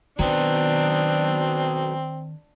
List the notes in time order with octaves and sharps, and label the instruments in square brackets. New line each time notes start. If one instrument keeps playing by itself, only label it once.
[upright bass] D#3 [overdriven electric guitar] F#3 B3 [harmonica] C4 [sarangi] D4